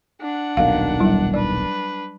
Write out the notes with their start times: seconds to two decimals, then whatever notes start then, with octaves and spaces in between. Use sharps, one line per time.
0.21 D4 F#5
0.57 D#1 B1 D#3 F5
1.00 F#3 G3 E4
1.34 D4 B4 D5